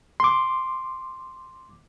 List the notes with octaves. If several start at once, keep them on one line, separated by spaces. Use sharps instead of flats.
C6 D6